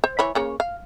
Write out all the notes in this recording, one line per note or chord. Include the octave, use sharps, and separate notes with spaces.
C5
E3 C#5 B5
C#3 A#3 C#5
F5